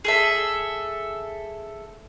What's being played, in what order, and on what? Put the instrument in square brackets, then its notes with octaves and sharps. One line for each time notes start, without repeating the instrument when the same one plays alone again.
[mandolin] G#4 A4 E5